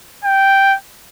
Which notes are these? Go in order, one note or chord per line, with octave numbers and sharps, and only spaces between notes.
G5